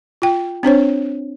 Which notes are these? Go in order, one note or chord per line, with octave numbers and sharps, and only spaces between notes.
F4 G5
C4 D4 C5 C#5